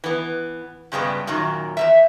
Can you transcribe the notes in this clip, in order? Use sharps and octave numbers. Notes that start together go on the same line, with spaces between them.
E3 B3
G2 C#3 G3 G#3 B3
F#2 A#2 D#3 F#3
E2 G3 E5